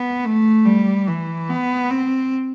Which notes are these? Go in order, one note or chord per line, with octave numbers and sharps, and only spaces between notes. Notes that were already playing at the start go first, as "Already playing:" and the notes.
Already playing: B3
A3
G3
E3
B3
C4